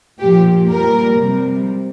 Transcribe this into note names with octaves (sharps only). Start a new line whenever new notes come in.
A#2 F3 G4
A#2 G3 A#4
C3 G3